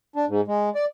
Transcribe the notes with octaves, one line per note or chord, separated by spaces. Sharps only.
D4
G#2
G#3
D5